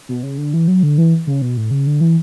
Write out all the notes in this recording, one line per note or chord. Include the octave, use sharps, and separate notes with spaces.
B2
C#3
D3
E3
F#3
D3
E3
C#3
B2
A2
C#3
D3
E3